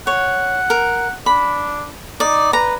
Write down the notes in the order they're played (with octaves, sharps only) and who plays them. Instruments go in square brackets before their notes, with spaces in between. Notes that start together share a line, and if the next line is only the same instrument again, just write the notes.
[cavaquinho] C#5 [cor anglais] F#5
[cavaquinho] A#4
[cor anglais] D4 [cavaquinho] B5
[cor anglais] D#4 [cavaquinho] D5
[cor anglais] B4 [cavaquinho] A#5